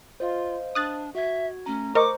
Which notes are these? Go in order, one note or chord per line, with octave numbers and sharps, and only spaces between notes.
F4 C5 D#5 F5
D4 D#6 F#6 A6
F#4 E5 G#6
A3 C#4 A#5
A#4 C5 D#5 A#5 C#6 D6